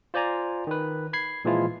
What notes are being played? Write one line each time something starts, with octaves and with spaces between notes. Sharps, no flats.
F4 C5 D5 G#5 A#5
D#3 B4
B5 G#6 C7
A#2 E3 F3 G#3 E4 F4